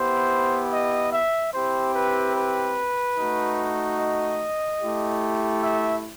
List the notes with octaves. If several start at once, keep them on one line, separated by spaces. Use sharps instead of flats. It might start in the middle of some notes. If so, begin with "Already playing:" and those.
Already playing: B3 E4 G4 C5
D#5
E5
C4 E4 G4 C5
B4
B4
A3 D#4 F#4
D#5
A3 E4 G4
E5